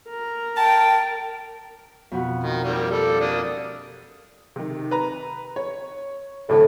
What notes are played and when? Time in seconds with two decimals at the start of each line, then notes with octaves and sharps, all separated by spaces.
0.10 A#4
0.57 G5 A5
2.11 F2 B2 F#4
2.43 D#3
2.64 G3 A#3
2.91 G3 A4
3.20 A#3 D4 D#6
4.56 C3 D#3
4.91 B4 A#5
5.56 C#5
6.49 D2 A2 C3